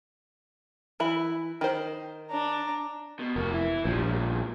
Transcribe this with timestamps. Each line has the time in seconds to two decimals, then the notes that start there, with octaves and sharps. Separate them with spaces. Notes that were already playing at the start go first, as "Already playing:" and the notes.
1.00 E3 E4 B5
1.61 D#3 C5
2.30 D4 A#5
3.19 B2
3.36 F1 A#3 F#4
3.50 E3 E4
3.85 A#1 F3 G3
4.03 C#2 G2